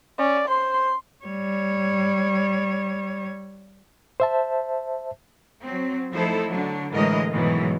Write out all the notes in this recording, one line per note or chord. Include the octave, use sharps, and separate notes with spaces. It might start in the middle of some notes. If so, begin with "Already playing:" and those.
C#4 D5
C5 C6
G3 C#5
C5 E5 A5
F#3 C4
F3 A3 D#4 E4 A4 C5
D3 F#3 D4
A2 D3 E3 G#3 A#4 D#5
G#2 B2 D#3 E3 F#3